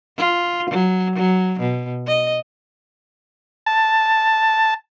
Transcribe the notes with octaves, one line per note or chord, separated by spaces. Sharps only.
F4
F#3
F#3
B2
D#5
A5